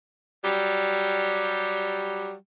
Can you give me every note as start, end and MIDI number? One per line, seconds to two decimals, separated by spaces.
0.45 2.34 54
0.45 2.34 55